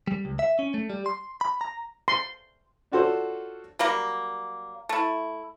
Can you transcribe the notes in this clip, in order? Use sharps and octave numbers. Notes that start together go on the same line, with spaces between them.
G3
C#2
E5
C#4
A3
G3
C6
B5
A#5
C6
D4 F4 F#4 A4 C5 C#5
F#3 G3 A#3
A3 E4